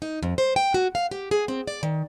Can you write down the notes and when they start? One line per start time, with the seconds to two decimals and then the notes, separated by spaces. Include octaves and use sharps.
0.02 D#4
0.23 F2
0.38 C5
0.56 G5
0.74 F#4
0.95 F5
1.11 G4
1.31 G#4
1.48 C4
1.67 D5
1.83 D#3